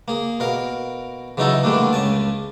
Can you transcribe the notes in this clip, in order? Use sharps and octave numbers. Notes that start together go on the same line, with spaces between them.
A#3 G#4
B2 A#4 F5
C#3 E3 F#3 D#4 E4 A4
D3 E3 G3 A3 A#3 D4
C#2 C#3 G#5 A5